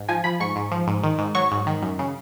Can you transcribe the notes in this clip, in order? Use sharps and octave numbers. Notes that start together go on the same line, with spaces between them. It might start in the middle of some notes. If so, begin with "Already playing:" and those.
Already playing: G#2
F3 G#5
F3 B5
G#2 C#6
G#2
F3
G#2
D#3
G#2
F#3 C#6
G#2
D#3
F#2
C#3